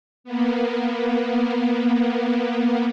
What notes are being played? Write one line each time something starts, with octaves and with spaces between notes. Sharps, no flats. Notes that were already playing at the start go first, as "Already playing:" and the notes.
A#3 B3